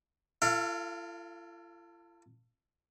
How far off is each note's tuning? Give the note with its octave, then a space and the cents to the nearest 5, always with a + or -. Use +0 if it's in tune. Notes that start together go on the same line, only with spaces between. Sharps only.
F4 -45 A4 +30 F5 +0